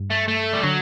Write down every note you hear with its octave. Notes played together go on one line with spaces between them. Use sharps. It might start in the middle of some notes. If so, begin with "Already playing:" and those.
Already playing: G2
A3
A3
G3
D3 F#3